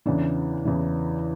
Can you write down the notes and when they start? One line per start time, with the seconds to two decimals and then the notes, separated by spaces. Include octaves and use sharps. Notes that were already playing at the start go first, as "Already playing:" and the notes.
0.06 E2 C#3 E3 D4
0.65 E2 C#3 E3